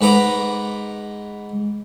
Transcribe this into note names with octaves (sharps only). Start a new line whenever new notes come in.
G#2 B4 F#5 A#5 D6